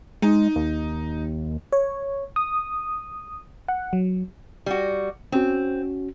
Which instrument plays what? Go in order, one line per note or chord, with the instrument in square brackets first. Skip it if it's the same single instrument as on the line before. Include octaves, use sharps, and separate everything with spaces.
[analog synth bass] G#3 [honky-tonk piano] D#4
[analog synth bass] D#2
[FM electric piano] C#5
D#6
F#5
F#3
[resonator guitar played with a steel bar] G3 F#4
[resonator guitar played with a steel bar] C4 [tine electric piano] C#4 F#4